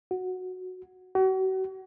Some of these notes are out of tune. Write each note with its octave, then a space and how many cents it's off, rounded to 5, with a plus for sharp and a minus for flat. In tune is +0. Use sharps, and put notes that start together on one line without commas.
F#4 -5
F#4 +40